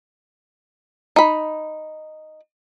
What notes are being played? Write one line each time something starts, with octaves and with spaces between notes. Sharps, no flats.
D#4 B5